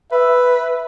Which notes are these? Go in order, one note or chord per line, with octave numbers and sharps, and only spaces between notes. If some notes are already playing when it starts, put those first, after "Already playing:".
B4 E5